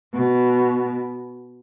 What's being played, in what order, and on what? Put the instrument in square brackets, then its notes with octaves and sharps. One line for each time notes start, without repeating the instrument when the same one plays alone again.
[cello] B2